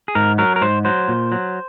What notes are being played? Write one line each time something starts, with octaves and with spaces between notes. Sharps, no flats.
G#4
G#2 A#4
F#3 A#4
A#4
G#2 C5
F#3 C5
A#2
F#3